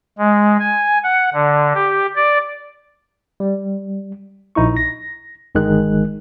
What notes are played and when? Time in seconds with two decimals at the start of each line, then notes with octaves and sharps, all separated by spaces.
0.18 G#3
0.59 G#5
1.04 F#5
1.33 D3
1.74 G4
2.15 D5
3.40 G3
4.55 A#1 D#4 E4 C#6
4.77 A#6
5.55 G1 D#3 G#3 F#6